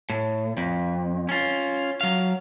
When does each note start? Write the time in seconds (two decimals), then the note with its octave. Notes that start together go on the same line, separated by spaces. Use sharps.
0.10 A2
0.57 F2
1.29 C#4 F4
2.01 F#3 F5